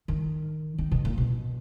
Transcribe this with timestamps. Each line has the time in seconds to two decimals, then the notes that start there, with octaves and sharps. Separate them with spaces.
0.08 D#3
0.78 D#3
0.91 B2
1.05 A#2
1.18 B2